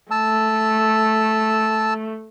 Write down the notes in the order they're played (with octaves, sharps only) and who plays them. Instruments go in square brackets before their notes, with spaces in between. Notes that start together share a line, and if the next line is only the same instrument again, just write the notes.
[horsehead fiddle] A3 [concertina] A5 E6